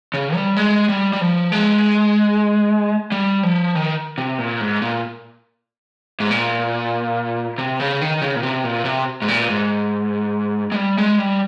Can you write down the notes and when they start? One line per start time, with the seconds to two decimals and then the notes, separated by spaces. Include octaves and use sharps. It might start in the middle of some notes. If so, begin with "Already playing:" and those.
0.14 C#3
0.35 G3
0.57 G#3
0.89 G3
1.13 G3
1.21 F3
1.52 G#3
3.12 G3
3.43 F3
3.75 D#3
4.18 C3
4.38 A#2
4.61 G#2
4.82 A#2
6.20 G#2
6.31 A#2
7.58 C3
7.80 C#3
8.01 D#3
8.21 C#3
8.36 A#2
8.43 C3
8.64 A#2
8.85 C3
9.22 G#2
9.28 A#2
9.49 G#2
10.72 G#3
10.76 G3
10.98 G#3
11.19 G3